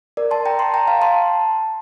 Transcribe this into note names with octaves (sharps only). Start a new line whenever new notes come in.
A#4 D5
A5 C6
G5 A#5
A5 C6
G5 A#5
F5 A5
A5 C6